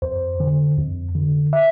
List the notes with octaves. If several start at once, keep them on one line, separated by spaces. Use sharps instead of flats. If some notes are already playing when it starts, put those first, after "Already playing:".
F2 C5
D3
F2
D3
E5